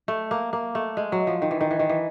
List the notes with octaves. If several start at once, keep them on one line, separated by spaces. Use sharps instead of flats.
A3
A#3
A#3
A3
G#3
F#3
F3
D#3
E3
D#3
E3
D#3
E3